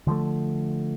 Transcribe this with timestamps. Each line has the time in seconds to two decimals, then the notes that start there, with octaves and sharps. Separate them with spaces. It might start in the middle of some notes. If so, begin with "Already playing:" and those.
0.07 D3 F3 G#3 A3